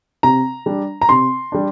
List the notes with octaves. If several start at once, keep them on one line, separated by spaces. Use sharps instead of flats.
C3 A#5
G3 D4
A#5
C3 C6
G3 D4